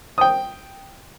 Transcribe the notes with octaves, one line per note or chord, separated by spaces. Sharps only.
G5 D#6